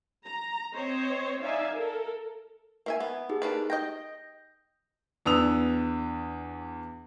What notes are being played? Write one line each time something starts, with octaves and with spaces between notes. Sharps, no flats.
A#5
C4 C5 C#5 D#5
D#4 D5 E5 F5 G#5
A4 A#4
A#3 E5 G#5
B3
D#4 G4 G#4
A#3 D4 B4
D#5 G5 G6 A#6
E2 B3 D4 D#6 E6 F7